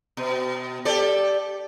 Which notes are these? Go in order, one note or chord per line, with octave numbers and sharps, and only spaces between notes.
B2
G4 A4 D5